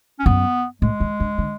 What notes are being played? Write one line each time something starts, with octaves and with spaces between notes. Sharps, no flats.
C#4
F#2 B3
A2 G#3
E3
D3
D3